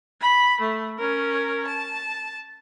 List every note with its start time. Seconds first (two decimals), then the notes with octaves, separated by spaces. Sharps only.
0.21 B5
0.60 A3
0.98 C#4 A#4
1.66 A5